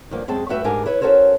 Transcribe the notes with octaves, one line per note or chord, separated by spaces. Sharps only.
G2 D3 F3 A#3
F#2 G#3 C4 G#4 A5
G2 A3 F#4 B4 E5 G5
G#2 G#3 D4 G4 A#4 G#5
E4 B4 C#5
C#4 F#4 A4 A#4 C5 C#5